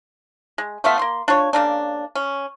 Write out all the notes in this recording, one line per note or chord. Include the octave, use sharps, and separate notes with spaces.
G#3
A3 B3 F4 E5
A#3 C6
D4 F4 C#5
C#3 A#3 D4
C#4